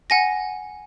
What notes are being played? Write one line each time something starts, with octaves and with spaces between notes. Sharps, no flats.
F#5 G#5 A#6